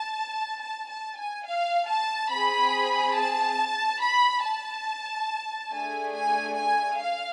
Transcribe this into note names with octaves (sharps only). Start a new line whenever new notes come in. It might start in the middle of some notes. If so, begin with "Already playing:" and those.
Already playing: A5
A5
A5
G#5
F5
A5
C4 G#4 B5
A5
B5
A5
A3 D4 G#4 G#5
G#5
G#5
F5